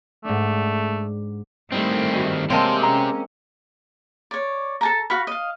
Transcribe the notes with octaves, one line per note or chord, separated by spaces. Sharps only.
G#2 A3 D4
D#3 G3 A3 C4 E4
F#4 G#5
C3 G#3 A#3 C4 G4 C#5 A5
C#4 G#4 A#5
C#5 D5
A4 A5 A#5
F#4 F5 B5
D#5 F5